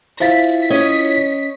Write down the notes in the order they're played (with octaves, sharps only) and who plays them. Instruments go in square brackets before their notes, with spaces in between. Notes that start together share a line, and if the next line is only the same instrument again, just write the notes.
[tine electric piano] E4 F4 A6 [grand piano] C5 E5 F5 [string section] B6
[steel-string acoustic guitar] C#4 C#5 D#5